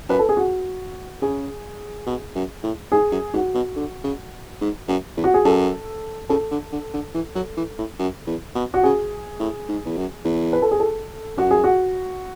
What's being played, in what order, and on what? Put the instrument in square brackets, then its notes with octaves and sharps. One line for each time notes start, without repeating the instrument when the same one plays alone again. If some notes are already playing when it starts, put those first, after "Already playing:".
[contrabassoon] F#2 [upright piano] B4
[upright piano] A4
G#4
F#4
[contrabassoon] C#3 [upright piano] G#4
[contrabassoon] B2
F#2
A2
[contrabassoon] G#2 [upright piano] G#4
[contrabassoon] F#2
[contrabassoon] G#2 [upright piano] F#4
[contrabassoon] B2
D3
C#3
G#2
F#2
E2
[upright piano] F#4
G#4
[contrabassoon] F#2 [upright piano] A4
[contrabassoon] C#3 [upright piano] A4
[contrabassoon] D3
D3
D3
E3
F#3
E3
A2
F#2
E2
B2
[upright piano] F#4
[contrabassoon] C#3 [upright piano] G#4
[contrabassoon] A2
G#2
E2
F#2
E2
[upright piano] B4
A4
G#4
A4
[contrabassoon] F#2 [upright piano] F#4
[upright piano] G#4
F#4